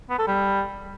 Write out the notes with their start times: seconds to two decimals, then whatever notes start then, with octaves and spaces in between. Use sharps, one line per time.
0.10 B3
0.18 A4
0.27 G3